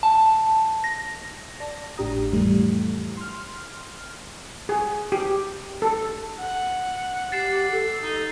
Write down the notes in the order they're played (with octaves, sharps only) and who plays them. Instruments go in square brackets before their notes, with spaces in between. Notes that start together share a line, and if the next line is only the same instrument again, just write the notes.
[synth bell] A5
A#6
[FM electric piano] D5 A5 A#6
G#1 A2 D4 G4 A#5 D#6
F2 A2 E3 G3 A3
C6 F6
[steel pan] G#4
G4
A4
[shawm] F#5
[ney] G4 [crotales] A6 C7 E7
[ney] A4
[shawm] D#4